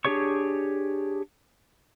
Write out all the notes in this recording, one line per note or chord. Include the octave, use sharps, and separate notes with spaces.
D4 G4 G#4 C#5 C#6